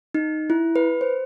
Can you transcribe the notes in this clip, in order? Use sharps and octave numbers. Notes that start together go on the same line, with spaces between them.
D#4
E4
B4
C5